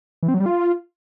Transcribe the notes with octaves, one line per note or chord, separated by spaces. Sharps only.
E3
C4
F#3
G3
F4